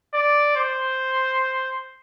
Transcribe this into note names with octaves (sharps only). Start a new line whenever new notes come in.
D5
C5